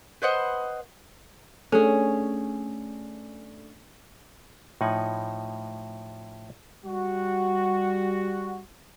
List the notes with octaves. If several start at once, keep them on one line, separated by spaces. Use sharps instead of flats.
B4 C5 D#5 F#5
A3 C#4 D4 G#4 A4
A2 F3 D#4 F#5 G#5
G3 F#4